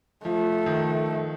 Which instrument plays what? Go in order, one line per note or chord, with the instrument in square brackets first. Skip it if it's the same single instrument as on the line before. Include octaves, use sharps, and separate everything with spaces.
[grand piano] F3 [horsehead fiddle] A3
[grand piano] D#3